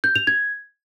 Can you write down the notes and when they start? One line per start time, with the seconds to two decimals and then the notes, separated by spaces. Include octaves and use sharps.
0.04 G6
0.15 F7
0.27 G#6